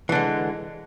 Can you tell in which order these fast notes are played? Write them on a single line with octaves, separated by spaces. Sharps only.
E3 D3 G#3